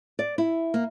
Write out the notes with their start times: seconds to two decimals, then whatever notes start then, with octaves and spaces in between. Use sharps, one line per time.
0.19 D5
0.38 E4
0.74 A#3